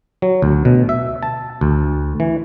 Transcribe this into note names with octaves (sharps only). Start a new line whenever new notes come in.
F#3
D2
B2
E5
A5
D2
E3